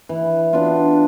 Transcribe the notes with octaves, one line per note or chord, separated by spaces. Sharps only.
E3
B3 D4 F4